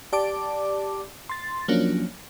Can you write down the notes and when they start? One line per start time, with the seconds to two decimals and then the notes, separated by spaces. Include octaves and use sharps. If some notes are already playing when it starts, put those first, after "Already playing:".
0.13 G4 D5 A5 D6
1.29 C6 A6
1.68 F3 F#3 A#3 C#4 D4